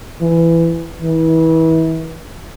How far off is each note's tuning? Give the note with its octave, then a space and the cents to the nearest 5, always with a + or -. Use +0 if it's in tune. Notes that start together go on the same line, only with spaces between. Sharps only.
E3 +15
E3 -30